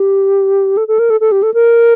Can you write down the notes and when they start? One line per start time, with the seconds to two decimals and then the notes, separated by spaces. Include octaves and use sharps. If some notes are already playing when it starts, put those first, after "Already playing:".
Already playing: G4
0.77 A4
0.88 A4
0.99 A#4
1.10 A4
1.20 A4
1.32 G4
1.43 A4
1.54 A#4